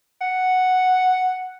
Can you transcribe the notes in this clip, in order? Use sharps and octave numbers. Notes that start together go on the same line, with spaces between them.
F#5